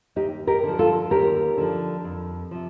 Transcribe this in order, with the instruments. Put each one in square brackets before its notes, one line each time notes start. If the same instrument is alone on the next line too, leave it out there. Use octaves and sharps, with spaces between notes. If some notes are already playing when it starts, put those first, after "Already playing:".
[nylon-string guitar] D#2 D#4 G4
G4 A#4
D3 F3
F4 A4
D#2 G4 A#4
D3 F3
F2
C3 F3